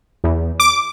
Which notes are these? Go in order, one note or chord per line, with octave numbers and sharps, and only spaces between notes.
E2
D6